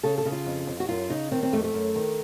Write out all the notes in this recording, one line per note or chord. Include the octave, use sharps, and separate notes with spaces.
C#3 A4
A4
C#3
F4
F2
F2
F#4
F#2 F4
C#3 D#4
D#3 C4
C4
F2 A3
A3
F#2
D#3